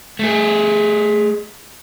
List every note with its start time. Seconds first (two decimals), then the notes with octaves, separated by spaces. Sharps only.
0.19 A3 G#4